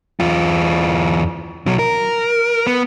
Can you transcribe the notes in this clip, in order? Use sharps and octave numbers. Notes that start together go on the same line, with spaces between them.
E2 F4
B1 F#3
A#4
B3